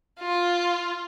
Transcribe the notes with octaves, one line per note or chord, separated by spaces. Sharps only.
F4